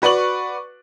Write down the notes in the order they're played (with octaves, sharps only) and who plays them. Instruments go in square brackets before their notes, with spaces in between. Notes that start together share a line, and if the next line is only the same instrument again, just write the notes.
[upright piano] F#4 B4 D5 C#6 F#7